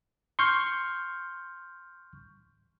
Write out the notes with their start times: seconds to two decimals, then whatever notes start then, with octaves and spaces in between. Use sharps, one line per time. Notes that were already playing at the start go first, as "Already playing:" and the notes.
0.39 C6 C#6 F6 G6